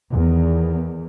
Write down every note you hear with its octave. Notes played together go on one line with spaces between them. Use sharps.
E2 D#3